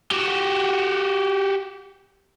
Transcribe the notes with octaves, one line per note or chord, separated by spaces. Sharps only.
F#4 G4